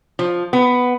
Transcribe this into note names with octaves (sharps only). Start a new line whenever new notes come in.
F3
B3